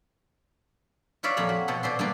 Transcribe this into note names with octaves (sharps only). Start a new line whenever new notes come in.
F4 B4 C#5 D5 E5 F5
F2 A#2 C#5 A#5 B5
F#4
B2 F4 A4 F#5
B2 D5 E5 C6
G2 A#3 B4 D5 C6